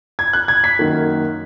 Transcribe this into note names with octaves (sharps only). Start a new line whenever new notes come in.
G#6
F#6
G#6
B6
F#2 D#3 A#3